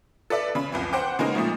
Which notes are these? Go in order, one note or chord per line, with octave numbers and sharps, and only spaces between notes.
A4 B4 D5 E5
C#3 B5
C2 F2 E3
C5 F#5 G5 D6
C#3 G#3 A#3 D#4 A#4
A#2 F3 A3 D#4